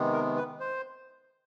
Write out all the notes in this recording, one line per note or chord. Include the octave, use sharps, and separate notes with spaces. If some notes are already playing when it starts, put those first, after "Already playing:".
Already playing: C3 D#3 G#3 B3
A#4
B4
C5